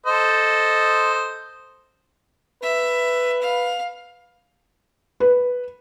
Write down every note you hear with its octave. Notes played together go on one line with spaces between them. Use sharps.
A4 C5 D#5
B4 E5
F5
B4